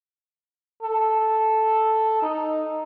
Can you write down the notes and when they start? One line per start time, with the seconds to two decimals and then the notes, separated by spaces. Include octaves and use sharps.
0.82 A4
2.23 D#4